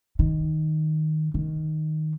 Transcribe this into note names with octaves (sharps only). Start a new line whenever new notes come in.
D#3
D#3